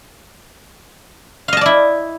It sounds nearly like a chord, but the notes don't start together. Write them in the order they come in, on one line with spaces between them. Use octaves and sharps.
F5 D#5 A5 D5 E4